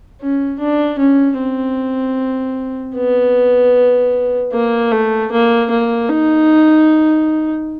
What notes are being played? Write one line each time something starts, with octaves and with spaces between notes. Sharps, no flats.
C#4
D4
C#4
C4
B3
A#3
A3
A#3
A#3
D#4